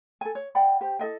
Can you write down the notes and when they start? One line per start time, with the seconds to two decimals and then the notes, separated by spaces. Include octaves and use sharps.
0.21 A4 G#5
0.35 C#5
0.55 D5 F#5 G5 B5
0.81 G4 C5
0.99 E4 A4 D#5 G5